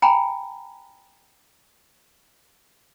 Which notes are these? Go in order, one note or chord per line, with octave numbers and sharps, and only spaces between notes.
G5 G#5 A#5 B5